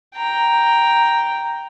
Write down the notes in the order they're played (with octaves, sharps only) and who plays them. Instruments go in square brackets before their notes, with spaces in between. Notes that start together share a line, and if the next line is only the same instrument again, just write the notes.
[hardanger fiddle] G5 A#5